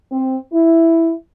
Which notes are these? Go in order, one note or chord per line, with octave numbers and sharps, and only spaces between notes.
C4
E4